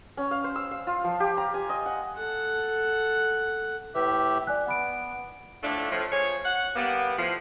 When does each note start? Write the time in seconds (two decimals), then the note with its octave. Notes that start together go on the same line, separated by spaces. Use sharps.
0.17 C#4
0.31 F5
0.44 C5
0.56 E6
0.71 F5
0.87 F4
1.04 F3
1.20 G4
1.37 A#5
1.54 G#5
1.69 D#5
1.86 F#5
2.17 A4 F#5
3.95 A2 G4 B4 E5
4.47 D5 G#5 F#6
4.66 B3 F#5 B5 D7
5.63 A2 F3 A3 D4
5.91 A2 F3
6.12 F3 G#4 C#5
6.45 F#5
6.76 G3 A#3 B3
7.18 A2 F3